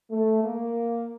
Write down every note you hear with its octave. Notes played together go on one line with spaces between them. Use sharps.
A3
A#3